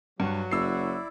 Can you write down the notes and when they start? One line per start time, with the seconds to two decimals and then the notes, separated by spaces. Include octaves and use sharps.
0.20 G2 F#3 F#4
0.51 F#1 E4 D5 E6 C7